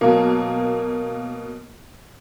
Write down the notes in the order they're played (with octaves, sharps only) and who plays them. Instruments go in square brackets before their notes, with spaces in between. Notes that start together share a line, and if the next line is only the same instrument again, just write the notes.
[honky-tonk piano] B2 F#3 A#3